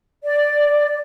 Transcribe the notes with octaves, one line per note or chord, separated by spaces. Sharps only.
D5